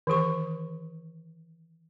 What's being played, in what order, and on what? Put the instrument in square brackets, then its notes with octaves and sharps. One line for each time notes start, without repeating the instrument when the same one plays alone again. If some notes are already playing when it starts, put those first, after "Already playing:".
[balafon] D#3 E3 G#4 C#6